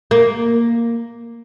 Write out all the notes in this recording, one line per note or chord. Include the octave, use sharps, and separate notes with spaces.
A#3